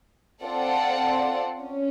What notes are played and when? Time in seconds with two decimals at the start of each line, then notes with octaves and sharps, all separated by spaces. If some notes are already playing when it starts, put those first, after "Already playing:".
0.43 C4 F4 A4 D5 F#5
1.60 C#4